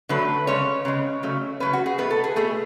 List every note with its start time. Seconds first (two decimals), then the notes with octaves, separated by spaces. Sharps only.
0.09 D3 F#3 A3 B4
0.47 C#3 G#3 C#5
0.85 C#3 G#3
1.23 C#3 F#3 A3
1.60 C#3 F#3 A3 B4
1.73 F#4
1.86 G#4
1.98 B2 A3 B4
2.11 A4
2.24 G#4
2.36 B2 A3 G#4